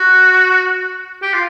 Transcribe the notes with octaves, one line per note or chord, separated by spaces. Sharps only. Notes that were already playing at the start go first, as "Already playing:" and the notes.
Already playing: F#4
G4
F4